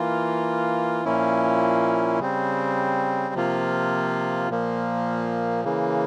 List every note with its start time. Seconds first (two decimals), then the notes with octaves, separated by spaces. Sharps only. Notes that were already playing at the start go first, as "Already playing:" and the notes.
Already playing: E3 A#3 F4
1.05 A#2 F3 A#3 C#4 E4
2.19 C#3 G3 C4
3.34 C3 F3 A#3 F4
4.50 A#2 F3 A#3
5.65 C#3 E3 A#3